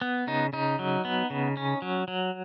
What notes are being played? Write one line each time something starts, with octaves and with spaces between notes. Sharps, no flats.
B3
C#3 D#4
C#3 D#4
F#3
B3
C#3
C#4
F#3
F#3